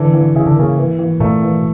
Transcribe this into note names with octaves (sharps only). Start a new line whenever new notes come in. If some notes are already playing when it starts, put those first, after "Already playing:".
Already playing: D3 E3
E3
C#3 E4
D3
C#3 A#3
E3
E3
A#2 A3
E3